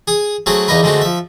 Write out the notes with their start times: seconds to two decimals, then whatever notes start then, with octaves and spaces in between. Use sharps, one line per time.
0.08 G#4 D#6
0.46 F#3 A3 C4 F#4 G#4 F#5
0.68 E2 A#3 D#4 A#4 B4
0.83 D3 G#3 A3 C4 F#4
1.02 F3 E5